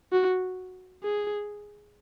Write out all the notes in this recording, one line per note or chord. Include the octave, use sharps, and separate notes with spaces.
F#4
G#4